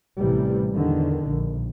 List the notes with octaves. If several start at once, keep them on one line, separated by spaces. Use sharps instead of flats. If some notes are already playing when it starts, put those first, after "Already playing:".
A1 C3 E3 G3
E2 D3 D#3
A#1